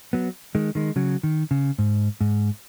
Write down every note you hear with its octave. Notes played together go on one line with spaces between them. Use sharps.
F#3 B3
D#3 G#3
D#3 G#3
C#3 F#3
D#3
C#3
G#2
G#2